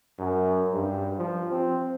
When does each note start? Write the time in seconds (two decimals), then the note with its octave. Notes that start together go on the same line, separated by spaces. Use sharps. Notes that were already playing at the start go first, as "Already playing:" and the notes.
0.19 F#2
0.72 G2
1.18 F3
1.51 C4